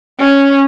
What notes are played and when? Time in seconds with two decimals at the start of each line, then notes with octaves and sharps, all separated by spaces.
0.19 C#4